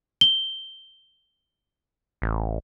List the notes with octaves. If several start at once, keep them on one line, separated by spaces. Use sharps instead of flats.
G7
A1